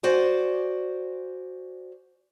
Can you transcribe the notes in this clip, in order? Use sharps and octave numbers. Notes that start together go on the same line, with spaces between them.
F#4 C5 D5 G#5